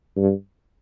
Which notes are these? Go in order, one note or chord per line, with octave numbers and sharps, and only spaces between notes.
G2